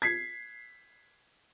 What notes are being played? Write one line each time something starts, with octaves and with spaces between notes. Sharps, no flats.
G#6 B6 C7